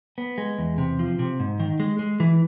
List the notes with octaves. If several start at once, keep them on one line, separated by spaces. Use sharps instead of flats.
B3
G#3
E2
C3
F3
C3
G#2
D#3
G#3
G#3
E3